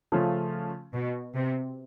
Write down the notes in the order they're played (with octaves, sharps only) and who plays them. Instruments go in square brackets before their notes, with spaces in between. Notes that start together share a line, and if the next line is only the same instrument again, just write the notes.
[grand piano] C#3 F3 A3 C#4 F4
[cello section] B2
C3